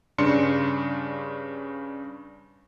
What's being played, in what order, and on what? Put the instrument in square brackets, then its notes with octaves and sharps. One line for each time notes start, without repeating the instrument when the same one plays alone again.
[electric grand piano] G2 C#3 D4 C6 C#7